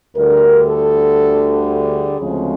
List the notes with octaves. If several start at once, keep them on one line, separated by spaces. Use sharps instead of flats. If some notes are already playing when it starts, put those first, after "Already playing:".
D2 D3 G3 A#4
A4
G#4
D2 C#3 F3 G#3 C4